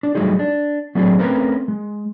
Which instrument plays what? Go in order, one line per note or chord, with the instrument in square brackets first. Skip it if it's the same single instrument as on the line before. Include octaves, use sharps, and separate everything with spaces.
[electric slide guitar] D4
F#3 G3 A3 D#4 G#4
D4
F#3 A3 C4 D4 E4 G#4
A3 C4 C#4 A#4 B4
G#3